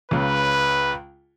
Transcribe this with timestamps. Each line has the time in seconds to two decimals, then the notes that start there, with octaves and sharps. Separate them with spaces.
0.11 C#2 C#3 B4